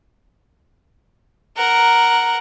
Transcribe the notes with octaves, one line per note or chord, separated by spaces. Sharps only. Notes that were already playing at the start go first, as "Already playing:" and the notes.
A#4 F#5